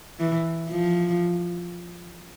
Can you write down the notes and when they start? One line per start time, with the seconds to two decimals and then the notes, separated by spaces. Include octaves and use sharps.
0.20 E3
0.70 F3